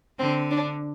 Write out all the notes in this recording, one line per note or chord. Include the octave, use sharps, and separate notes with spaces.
D3 C4
D4